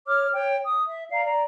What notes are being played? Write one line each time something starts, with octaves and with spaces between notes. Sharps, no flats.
C#5 D6 F6
C#5 G5
D#6
E5
D5 F5 A#5
D5 A#5